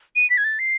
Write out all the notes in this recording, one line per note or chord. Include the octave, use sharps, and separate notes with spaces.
D#7
B6
G#6
A6
C7